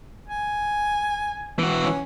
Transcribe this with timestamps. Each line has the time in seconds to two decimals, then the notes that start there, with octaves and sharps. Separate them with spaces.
0.27 G#5
1.59 E3 F#4
1.83 C#4